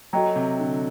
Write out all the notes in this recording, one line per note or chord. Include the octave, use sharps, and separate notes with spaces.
F#3 F#4 A4 D#5 G5 A#5
C3
D3